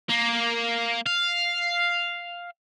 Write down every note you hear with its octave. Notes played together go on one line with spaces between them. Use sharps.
A#3
F5